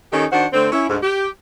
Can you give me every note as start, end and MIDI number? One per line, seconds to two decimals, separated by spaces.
0.12 0.26 51
0.12 0.26 61
0.12 0.26 63
0.12 0.26 67
0.12 0.26 69
0.32 0.47 51
0.32 0.47 62
0.32 0.47 66
0.32 0.47 72
0.32 0.47 78
0.53 0.72 50
0.53 0.72 57
0.53 0.72 60
0.72 0.86 61
0.72 0.86 64
0.90 0.98 38
0.90 0.98 44
1.02 1.29 67